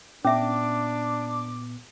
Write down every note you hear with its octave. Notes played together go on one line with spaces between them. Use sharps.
A#2 B3 C#4 D4 E5 D6